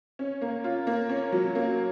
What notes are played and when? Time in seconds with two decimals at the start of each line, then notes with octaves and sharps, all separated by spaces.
0.19 C#4
0.42 A#3
0.64 F4
0.87 A#3
1.09 C#4
1.32 F#3
1.55 A#3